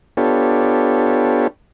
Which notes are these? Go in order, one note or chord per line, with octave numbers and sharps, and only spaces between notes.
B3 D4 F4 G4 A4 C#5